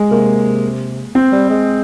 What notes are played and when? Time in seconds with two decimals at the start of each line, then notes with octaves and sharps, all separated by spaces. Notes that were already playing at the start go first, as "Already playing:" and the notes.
Already playing: G#3
0.11 C3 A#3
1.15 C4
1.32 G3
1.50 G#3